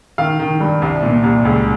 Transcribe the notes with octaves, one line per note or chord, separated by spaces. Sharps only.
D#3 F5
D#3
G2
C2
A#2
C2
C#2